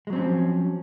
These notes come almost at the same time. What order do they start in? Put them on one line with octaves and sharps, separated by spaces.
G#3 F#3 C4 C#4 F3